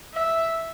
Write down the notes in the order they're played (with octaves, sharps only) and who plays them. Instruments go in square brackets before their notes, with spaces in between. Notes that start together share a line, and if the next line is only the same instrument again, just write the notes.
[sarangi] E5